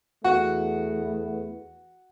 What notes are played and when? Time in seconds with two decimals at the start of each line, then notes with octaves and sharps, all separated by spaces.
0.24 E2 A3 B3 F#4